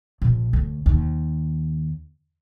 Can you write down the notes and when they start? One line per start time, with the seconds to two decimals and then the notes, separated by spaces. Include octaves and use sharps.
0.22 A#1
0.53 D2
0.86 D#2